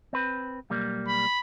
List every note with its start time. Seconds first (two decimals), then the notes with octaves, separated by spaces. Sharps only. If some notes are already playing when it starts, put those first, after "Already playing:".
0.13 C4 B4
0.70 B1 G3 A#3
1.08 B5